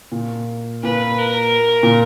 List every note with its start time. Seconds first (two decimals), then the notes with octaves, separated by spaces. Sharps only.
0.12 A#2
0.83 A#2 B4
1.18 A#4
1.83 A#2